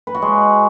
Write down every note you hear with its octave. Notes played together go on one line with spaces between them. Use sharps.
B4
F#4
G#3